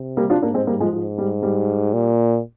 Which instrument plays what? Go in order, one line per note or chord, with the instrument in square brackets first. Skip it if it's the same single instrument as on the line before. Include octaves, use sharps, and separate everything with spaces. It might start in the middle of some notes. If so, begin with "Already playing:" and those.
Already playing: [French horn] C3
[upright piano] G3 A#3
D4 F4
[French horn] G#2 [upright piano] A#3 D4
[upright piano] G#3 C4
G3 A#3
F3 G#3
[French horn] G#2 [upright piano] F3
[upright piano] G3
G3
[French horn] A#2